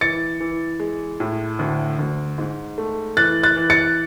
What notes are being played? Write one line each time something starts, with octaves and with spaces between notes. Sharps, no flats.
E3 A6 C#7
E3
G#3
A2
D2
D2
G#2
A3
E3 F#6 A6
F#6 A6
E3
A6 C#7